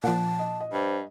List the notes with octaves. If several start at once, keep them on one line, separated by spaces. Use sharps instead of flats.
A#2 F3 F#5 A5
D#5
D#5
G2 C5